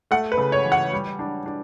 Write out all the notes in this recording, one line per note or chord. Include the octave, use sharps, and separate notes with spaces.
A3 F#5
B4
C#3
C#5
E3
F#5
G3
D4
D4